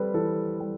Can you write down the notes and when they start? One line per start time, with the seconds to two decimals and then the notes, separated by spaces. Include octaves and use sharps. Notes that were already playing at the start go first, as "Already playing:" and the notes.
Already playing: G3 C4 A4 B4
0.14 E3 A4
0.61 G3